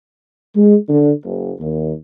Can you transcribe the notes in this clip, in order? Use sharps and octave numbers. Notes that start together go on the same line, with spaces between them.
G#3
D3
F#1
D#2